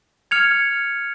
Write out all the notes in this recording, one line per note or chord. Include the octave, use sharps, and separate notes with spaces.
F6 G#6 C#7 F7